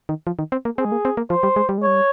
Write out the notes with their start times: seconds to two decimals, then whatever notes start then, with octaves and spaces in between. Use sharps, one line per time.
0.09 D#3
0.27 F3
0.39 D#3
0.52 C4
0.65 A#3
0.78 C4 G#4
0.85 G#3
0.92 A#3
1.05 C4
1.17 A#3
1.30 F3 C5
1.43 G3
1.56 G#3
1.69 G3
1.78 G#3
1.82 G3 C#5